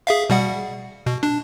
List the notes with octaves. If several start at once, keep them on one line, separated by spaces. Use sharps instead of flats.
G#4 E5 F5
B2 G3 F#5
B2
D4